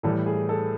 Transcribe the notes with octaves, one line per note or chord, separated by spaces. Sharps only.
A2 E3 G3 A4
G#4
A4